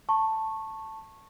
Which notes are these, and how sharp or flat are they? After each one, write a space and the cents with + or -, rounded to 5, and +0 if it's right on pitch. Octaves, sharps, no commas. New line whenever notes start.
A5 +5 C#6 -15